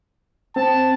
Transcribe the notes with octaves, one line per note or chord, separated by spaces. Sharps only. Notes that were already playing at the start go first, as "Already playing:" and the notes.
C4 A5